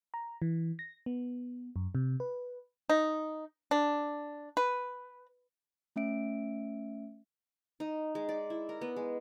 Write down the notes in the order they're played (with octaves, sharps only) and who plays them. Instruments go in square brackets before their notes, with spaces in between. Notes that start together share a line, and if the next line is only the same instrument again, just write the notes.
[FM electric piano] A#5
E3
A#6
B3
F#2
C3
B4
[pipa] D#4
D4
B4
[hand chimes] A3 C#4 E5 D7
[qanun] D#4
G#3
D5
E4
A#4
B3
G#3